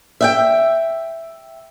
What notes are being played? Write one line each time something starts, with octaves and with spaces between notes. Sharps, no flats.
E5 F#5 G5